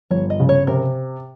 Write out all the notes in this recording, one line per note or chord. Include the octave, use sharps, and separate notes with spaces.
G1 C#5
D#5
C#3
C#5
C3 A#4